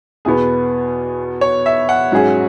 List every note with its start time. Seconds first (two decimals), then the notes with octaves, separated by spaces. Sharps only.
0.25 E2 B2 B3 G#4
1.41 C#5
1.66 E5
1.89 F#5
2.12 G#2 F#3 C#4 G#4